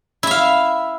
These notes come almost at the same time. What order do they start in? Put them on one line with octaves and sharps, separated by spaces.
E4 E5 F5